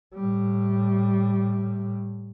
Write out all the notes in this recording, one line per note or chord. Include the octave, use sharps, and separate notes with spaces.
A2 G3